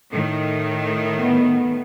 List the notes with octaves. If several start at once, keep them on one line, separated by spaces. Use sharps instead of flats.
A2 D#3
B3